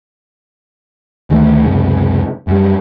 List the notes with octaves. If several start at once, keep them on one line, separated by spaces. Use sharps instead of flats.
D2 D#3 A3
C#2 F#2 C3
F#2 G3